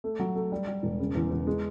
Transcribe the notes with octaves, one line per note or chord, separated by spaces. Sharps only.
A3
F#3
A3
G3
G3
E1
C#3
E2
E2
G#3